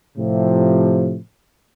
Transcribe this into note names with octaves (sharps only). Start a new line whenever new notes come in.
A2 C3 F3